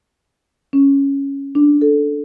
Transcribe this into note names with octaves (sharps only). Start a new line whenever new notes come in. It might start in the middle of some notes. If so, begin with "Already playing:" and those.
C#4
D4
A4